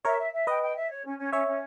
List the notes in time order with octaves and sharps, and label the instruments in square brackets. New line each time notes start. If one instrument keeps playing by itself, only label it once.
[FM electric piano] A#4 C#5 [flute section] E5
[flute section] E5
E5
[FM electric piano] B4 D#5 [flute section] G5
[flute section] G5
E5
C#5
C#4
C#4
[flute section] C#4 [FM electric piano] C#5 E5
[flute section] C#4